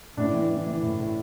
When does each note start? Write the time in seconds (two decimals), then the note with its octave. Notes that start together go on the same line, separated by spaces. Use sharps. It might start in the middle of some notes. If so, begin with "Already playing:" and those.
0.17 A2 D4
0.33 E3
0.50 E3
0.67 E3
0.82 A2
1.00 A2